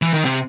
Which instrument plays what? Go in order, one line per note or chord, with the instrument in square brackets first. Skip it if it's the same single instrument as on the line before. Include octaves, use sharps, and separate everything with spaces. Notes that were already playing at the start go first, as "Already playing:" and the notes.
[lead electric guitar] E3
D#3
C3